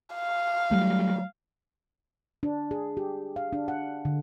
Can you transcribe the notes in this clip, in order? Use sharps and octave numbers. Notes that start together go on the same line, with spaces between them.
F5
F#3 G3 A3
D4
G#4
G4
F5
D4
F#5
D3